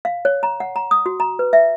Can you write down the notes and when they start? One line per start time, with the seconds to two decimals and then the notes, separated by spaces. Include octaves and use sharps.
0.05 F5
0.25 C#5
0.43 A#5
0.60 F#5
0.76 A#5
0.91 D#6
1.06 F#4
1.20 A#5
1.39 B4
1.53 E5